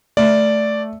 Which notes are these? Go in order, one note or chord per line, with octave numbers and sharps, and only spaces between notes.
A3 D5